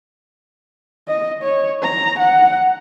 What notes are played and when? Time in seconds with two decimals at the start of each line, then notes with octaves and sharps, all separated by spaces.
1.08 D#5
1.43 C#5
1.82 A#5
2.19 F#5